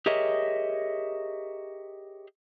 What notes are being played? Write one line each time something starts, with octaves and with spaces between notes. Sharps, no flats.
G4 G#4 A#4 C#5 D#5 E5